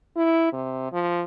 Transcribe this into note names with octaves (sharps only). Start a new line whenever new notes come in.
E4
C3
F3